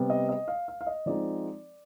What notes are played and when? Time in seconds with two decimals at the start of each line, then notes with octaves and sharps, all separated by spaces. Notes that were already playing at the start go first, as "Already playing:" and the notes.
Already playing: C3 G3 B3
0.10 D#5
0.29 D#5
0.48 F5
0.68 F5
0.81 F5
0.87 D#5
1.06 F3 G#3 C4 D#4 D5